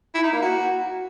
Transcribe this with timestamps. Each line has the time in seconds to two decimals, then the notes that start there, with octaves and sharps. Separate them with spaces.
0.15 E4
0.24 D#4
0.33 A#3
0.42 F#4